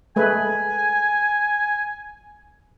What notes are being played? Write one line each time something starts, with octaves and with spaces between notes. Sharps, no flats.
G#3 A3 B4 G#5